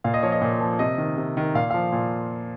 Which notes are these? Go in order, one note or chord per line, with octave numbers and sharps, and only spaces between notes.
A#2 F5
D#5
F3 C#5
D#5
A#2
F3
C3 D#5
D#3
C3
D#3
A#2 F5
F3 F5
A#2